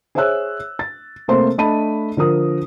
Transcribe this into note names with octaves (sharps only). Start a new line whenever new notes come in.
G#4 C5 C#5 E5 E6 F#6
A6
C3 A3 A#3 C5 C6
A3 D4 D#5 A5 B5 D#7
D3 F3 A#4 D#6